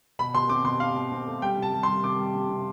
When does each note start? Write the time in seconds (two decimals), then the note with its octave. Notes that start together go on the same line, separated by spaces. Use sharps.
0.19 B2 B5
0.34 B2 C6
0.49 C4 D6
0.64 B2 C6
0.80 C4 F5
0.96 B2
1.12 C4
1.27 A3
1.42 G3 G5
1.57 C3
1.62 A5
1.73 G3
1.83 C6
1.88 G3
2.03 C3 D6
2.19 G3
2.35 C3
2.49 C3